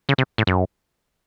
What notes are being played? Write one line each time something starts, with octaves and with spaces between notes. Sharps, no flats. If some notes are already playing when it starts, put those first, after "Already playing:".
C#3
C3
A2
F#2